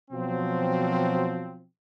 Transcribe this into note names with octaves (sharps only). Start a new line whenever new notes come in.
B2 F3 F#3 C4